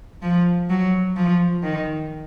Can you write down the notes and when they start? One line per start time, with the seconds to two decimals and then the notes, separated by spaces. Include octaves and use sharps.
0.22 F3
0.69 F#3
1.16 F3
1.63 D#3